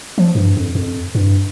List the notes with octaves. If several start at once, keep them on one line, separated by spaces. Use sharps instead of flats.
F3
G2
F2
F2
G2